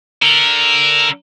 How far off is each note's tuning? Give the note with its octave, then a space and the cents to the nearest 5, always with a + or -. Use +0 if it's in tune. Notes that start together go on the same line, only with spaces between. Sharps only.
D3 +0 A#4 +0